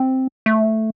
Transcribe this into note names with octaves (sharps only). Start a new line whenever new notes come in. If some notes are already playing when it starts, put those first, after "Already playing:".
Already playing: C4
A3